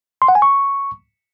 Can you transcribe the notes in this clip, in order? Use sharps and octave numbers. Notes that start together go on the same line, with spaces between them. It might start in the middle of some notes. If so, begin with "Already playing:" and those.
C6
F#5
G#5
C#6